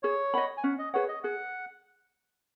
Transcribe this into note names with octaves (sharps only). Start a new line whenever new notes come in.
G#4 C#5
D#5 F#5 B5
G#5
C#4 F#5
D#5
G#4 B4 C#5 F#5
D#5
G#4 F#5